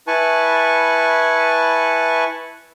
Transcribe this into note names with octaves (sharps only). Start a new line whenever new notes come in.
E4 B4 G#5 A5 C#6